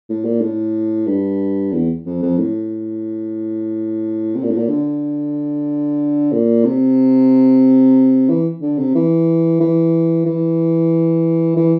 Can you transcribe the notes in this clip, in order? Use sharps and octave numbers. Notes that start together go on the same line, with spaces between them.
A2
A#2
A2
G2
E2
F2
F2
A2
C3
A#2
A2
A#2
D3
A#2
C3
E3
D3
C3
E3
E3
E3
E3